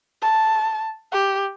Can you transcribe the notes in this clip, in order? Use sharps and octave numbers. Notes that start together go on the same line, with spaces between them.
A5
G4